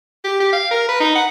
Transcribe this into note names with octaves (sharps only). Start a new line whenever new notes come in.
G4
G4
F5
A#4
B4
D#4
F#5